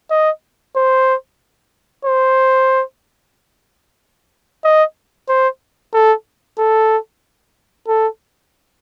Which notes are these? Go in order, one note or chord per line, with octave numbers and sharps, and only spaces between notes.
D#5
C5
C5
D#5
C5
A4
A4
A4